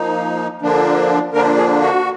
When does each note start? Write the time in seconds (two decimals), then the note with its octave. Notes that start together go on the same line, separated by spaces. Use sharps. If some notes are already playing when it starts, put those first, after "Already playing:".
Already playing: F3 A#3 D#4
0.62 D3 F3 A#3 D4
1.33 D3 F3 A#3 D4 A#4
1.57 G#4
1.81 F#4